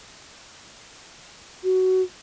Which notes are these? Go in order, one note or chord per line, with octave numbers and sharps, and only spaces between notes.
F#4